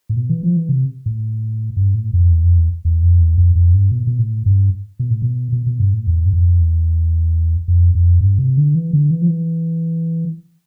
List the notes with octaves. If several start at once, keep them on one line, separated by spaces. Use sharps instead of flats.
A2
B2
E3
F3
E3
C3
A2
G2
A2
F2
E2
F2
E2
E2
F2
E2
F2
F2
G2
B2
B2
A2
G2
B2
A2
B2
B2
B2
G2
A2
E2
G2
F2
E2
F2
F2
G2
C3
D3
E3
D3
E3
F3
E3